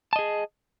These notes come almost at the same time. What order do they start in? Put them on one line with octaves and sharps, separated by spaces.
A5 D#5 G#4